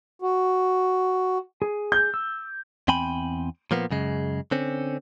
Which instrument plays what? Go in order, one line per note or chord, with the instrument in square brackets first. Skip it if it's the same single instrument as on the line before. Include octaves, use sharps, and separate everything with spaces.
[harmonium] F#4
[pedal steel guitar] G#4
[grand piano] G6
[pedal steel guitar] E6
[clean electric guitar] E2 C4 G5 G#5 B5
A#2 F3 A#3 B3
F#2 C#3 G#3
D3 C4 C#4